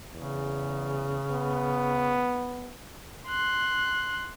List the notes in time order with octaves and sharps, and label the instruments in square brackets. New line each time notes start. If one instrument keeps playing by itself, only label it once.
[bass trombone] E2 [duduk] C#3
[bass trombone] B3
[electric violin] C6 F#6